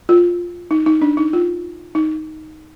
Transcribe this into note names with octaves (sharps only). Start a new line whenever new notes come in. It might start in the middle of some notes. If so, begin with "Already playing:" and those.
F4
D#4
D#4
D4
D#4
F4
D#4